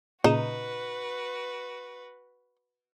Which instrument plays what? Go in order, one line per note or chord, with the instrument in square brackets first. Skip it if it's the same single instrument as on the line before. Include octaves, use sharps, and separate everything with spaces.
[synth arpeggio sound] A#2 C#3 E7 [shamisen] D#4 [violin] F#4 B4